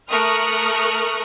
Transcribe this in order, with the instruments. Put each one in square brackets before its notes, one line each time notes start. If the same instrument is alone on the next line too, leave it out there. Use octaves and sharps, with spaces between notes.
[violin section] A3 A#4 C#6 D#6 F6 F#6